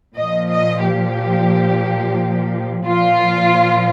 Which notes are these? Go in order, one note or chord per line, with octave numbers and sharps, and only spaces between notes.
A#2 F3 D#5
D#5
G4
A#2 F3 F4